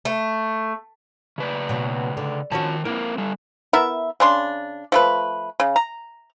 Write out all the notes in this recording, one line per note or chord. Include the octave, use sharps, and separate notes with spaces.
A3
C#3 B4 D5
B2 F#3
D3
D#3 F3 C#4 F#4 A5
A#3 C4 E4 A#4
G3 A4
B3 E4 A#4 E5
C#3 D4 C6
F3 A3 B4
C#3
A#5